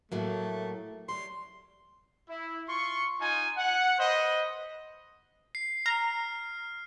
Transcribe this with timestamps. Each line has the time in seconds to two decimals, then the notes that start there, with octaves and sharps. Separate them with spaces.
0.12 A2 F#3 A3 A#3
1.09 F#3 G3 C6
2.29 E4
2.67 F4 C6 C#6
3.20 D#4 F4 G#5
3.57 F#5
3.98 B4 C5 D#5
5.55 C7
5.86 A#5 F6